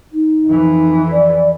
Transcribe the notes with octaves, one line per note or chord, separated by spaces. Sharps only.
D#4
F2 E3
D5